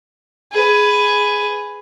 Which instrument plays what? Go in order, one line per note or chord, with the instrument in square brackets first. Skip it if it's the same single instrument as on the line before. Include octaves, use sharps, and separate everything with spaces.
[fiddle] G#4 B4